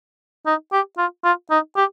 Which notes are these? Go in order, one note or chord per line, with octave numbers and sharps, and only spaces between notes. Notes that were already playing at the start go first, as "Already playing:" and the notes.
D#4
G4
F4
F4
D#4
G4